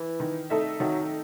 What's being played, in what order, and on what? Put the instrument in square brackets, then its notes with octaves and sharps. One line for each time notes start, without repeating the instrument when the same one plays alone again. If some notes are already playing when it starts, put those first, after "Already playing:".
Already playing: [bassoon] E3
[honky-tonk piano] D#3
A3 D#4 A4 E5
[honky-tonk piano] D#3 [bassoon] F#3